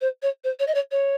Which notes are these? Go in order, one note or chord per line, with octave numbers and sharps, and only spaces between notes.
C5
C#5
C5
C#5
D#5
C#5
C#5